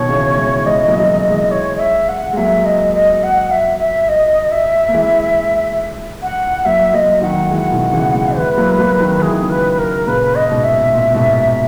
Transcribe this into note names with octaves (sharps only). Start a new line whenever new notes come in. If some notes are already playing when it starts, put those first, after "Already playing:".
Already playing: B2 D#3 C#5
C#3 E3
E3 G#3
E3 G#3 D#5
F#3 A#3
F#3
E3 G#3
E3 G#3
C#5
D#5
E5
F#5
G#3
F#3 A#3 E5
D#5
D#5
F#5
E5
E5
D#5
E5
A#3
E3 G#3
F#5
F#3 A#3 E5
F#3 A#3 D#5
D#3 F#3 F#5
E3 G#3 F#5
B2 D#3
C#3 E3
E3 G#3
E3 G#3 B4
F#3 A#3
F#3 A#3
D#3 F#3
E3 G#4
D#3
C#3 E3
B4
A#4
A#2 C#3 B4
D#5
G#2 B2
E5
A#2
G#2 B2